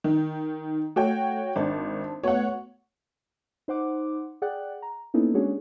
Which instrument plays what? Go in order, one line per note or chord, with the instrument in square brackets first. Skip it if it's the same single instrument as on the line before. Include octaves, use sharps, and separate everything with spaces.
[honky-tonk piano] D#3
[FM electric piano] A3 [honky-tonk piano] F#4 C#5 G5
[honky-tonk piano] G#1 [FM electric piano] D4 C5 A5
[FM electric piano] A3 B3 F#4 [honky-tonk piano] C#5 F#5
[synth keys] D#4 C5 F#5 D6
G#4 D5 F#5 G5 F#6
A#5
A#3 B3 C#4 D#4 E4 A4
G#3 C#4 D4 F#4 G#4 C#5